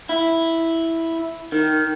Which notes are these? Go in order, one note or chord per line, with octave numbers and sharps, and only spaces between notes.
E4
D#3